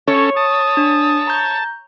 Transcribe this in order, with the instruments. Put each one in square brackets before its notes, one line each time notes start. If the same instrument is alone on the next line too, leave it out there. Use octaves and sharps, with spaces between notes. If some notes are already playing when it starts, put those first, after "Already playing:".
[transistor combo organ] C#4 A4 [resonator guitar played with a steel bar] C#5
[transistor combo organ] A5 [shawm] D#6
[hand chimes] D4
A#5 G6